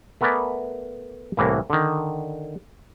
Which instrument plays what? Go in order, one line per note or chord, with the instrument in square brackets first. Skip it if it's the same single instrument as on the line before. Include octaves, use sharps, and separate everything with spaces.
[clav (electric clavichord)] A3 B3 A#4 B4 D5 G#5
C2 A2 E3 A#3
D3 D#3